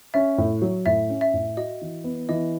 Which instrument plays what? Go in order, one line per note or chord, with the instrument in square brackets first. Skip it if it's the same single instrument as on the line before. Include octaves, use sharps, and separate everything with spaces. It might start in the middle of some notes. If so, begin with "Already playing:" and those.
[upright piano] C#4 [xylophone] E5
[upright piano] A2
F#3
[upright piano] A2 [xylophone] E5
[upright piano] C#4
[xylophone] E5
[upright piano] A2
[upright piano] F#4 [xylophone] D#5
[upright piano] E3
B3
[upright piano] E3 [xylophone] D#5